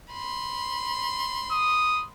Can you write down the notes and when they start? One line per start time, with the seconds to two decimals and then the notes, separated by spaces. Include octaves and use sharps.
0.13 B5 C6
1.51 D#6